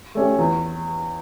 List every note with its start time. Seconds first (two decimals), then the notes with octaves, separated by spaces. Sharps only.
0.15 A3 C#4 G4
0.38 E2